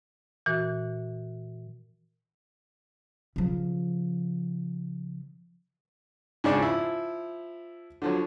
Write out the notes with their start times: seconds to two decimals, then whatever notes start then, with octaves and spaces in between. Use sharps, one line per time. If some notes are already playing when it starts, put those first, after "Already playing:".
0.46 A#2 E3 F#4
3.36 C#3 F3
6.44 G#2 C#3 D4
6.59 F3 E4
8.02 D3 F3 F#3